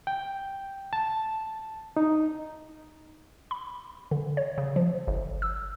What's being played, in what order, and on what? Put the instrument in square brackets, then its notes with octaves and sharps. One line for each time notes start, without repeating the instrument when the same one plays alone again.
[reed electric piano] G5
A5
D#4
[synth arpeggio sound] B5
D3
C#5
C#3
F3
G1
E6